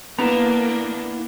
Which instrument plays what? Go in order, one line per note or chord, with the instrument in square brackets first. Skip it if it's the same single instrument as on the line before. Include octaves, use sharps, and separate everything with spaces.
[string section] A#3 D4 [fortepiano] B3 [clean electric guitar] E4 B4 A#5